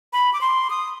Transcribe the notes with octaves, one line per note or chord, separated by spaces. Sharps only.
B5
D6
C6
D#6